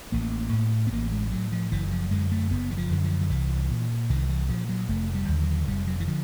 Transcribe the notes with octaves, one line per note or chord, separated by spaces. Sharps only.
A1 A#3
A2
B3
A1 A#3
G#3
A2 F#3
F3
F#1 E3
E3
F3
F#2 D3 G#3
A3
F#1 B3
E3
F3
F#2 D3
F3
F3
C2 E3
A#2
C2 D#3
E3
A#2 F3
F#3
F1 A3
G3
D#2 D3
F#3
F1 G3
F#3
E3
D3 F3